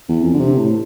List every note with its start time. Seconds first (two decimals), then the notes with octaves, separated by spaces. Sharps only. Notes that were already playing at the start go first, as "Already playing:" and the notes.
0.09 E2
0.24 F2
0.34 D3
0.41 C3
0.58 A2